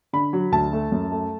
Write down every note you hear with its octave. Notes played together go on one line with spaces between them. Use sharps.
D3 B5
F#3
D2 A5
A3
F#2
A3